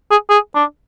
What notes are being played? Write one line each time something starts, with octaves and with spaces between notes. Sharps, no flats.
G#4
G#4
D4